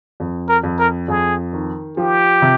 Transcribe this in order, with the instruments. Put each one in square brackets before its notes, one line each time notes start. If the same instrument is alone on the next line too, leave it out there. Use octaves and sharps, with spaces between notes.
[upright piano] F2
[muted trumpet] A#4
[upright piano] F2
[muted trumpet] A#4
[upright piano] F2 [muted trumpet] G#4
[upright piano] D#3
[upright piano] F3 [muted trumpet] G4
[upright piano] C3